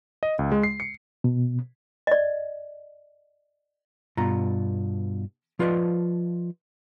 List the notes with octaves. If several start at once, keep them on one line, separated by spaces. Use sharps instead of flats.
D#5
C#2
G#3
C7
C#7
B2
D5 D#5
G2 B2 F4 A#5
F3 F4 B4 D5 D#5